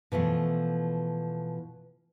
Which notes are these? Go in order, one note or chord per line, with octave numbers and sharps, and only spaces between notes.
B2 E3 F3 A3